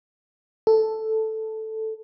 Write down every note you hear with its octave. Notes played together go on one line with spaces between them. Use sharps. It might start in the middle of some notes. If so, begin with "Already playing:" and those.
A4